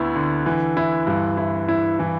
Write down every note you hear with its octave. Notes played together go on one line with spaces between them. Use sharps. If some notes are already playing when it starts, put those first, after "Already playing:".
Already playing: D2 D3 B3 E4
D3
E3
E4
G2
E4
E4
E3